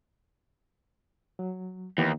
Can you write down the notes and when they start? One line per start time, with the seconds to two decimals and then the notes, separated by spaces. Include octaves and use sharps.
1.39 F#3
1.98 D#2 E3 B3 G4